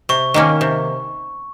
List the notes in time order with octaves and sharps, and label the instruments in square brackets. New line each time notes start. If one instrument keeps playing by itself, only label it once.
[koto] C3 [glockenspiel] C#6
[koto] D#3 A#3 C#4
C3